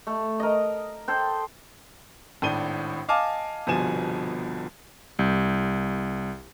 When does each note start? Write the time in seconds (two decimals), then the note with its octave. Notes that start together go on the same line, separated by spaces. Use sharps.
0.07 A3
0.40 A#4 D#5
1.08 A4 C5 G5
2.42 G#1 A2 D4 D#7 G7
3.08 D#5 F5 G#5 A5 D6 F6
3.67 G1 C2 B2 F3 G#5 E7
5.19 C2 G6